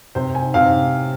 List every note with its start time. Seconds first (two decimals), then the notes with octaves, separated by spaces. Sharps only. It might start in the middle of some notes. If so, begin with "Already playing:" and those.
0.15 C3 C5
0.35 G#5
0.54 C3 F5